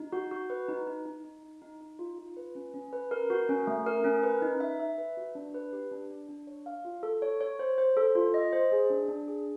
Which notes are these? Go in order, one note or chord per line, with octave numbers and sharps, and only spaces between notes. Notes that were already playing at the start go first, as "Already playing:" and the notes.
Already playing: D#4
F#4
F#4
B4
D#4
D#4
D#4
D#4
D#4
D#4
D#4
F4
F4
B4
C#4
C#4
B4
A#4
F#4
C#4
A3
A#4
C#4
B4
D#4
E5
E5
B4
F#4
D4
B4
G4
D4
D4
D4
C#5
F5
F4
A4
C#5
C#5
C5
C5
A4
F4
D#5
C5
G#4
D4
D4
G#4